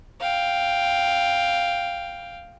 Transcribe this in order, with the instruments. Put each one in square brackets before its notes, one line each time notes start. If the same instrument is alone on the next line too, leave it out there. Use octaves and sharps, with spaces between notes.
[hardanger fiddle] F5 G5